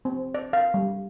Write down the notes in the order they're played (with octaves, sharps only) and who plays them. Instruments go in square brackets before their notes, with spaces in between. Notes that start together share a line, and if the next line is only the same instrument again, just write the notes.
[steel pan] C4
D5
F5
G3